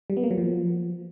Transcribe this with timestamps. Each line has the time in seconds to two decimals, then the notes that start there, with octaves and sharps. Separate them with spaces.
0.10 G3
0.17 B3
0.24 A#3
0.31 F#3
0.38 F3